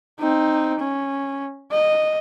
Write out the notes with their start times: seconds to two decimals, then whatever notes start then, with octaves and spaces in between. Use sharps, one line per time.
0.20 C4 D#4
0.80 C#4
1.72 D#5